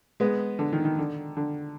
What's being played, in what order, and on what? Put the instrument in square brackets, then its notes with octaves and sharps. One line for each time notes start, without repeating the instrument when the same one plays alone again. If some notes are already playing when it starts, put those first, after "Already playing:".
[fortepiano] G#3 B3
D3
D#3
D#3
D3
D3